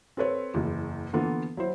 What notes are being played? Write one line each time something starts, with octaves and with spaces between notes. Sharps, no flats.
C4 A4 B4 C#5
F#1 E2
D3 E3 A#3 B3 F4 A4
F#3 E4 C5